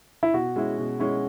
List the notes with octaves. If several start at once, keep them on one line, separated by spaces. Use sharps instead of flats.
E4
B2 F#4
G#3 C#4 E4
B2
G#3 C#4 E4